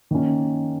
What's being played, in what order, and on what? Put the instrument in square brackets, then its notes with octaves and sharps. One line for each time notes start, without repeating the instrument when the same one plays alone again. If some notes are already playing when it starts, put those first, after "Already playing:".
[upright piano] D#3 A#3 C#4